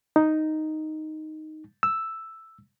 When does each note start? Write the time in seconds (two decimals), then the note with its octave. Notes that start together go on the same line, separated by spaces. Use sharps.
0.16 D#4
1.83 E6